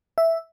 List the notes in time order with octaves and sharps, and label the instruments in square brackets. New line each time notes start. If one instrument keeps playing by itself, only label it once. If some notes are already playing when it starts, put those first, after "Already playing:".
[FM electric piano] E5